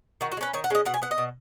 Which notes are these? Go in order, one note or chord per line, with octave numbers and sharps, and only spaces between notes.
D#3 F#4
F#4
G#3
C#4 B4
D#3 C#5
F#5
G#3 C#4 D#5
B2 F#5
G#5
B3 F#5
D#5
B2